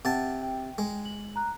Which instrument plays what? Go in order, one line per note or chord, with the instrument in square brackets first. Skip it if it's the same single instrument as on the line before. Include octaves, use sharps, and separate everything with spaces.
[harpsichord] C3 A5 [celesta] F#5
[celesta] G5
[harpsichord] G#3
[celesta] F#7
A#5 F#6